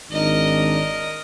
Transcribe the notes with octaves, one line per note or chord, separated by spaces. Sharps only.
G#1 D#3 D4 A#4 D#5